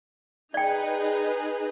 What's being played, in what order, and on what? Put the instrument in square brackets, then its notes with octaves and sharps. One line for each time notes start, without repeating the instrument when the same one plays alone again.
[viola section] D#4 G#4 B4 [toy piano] D5 G5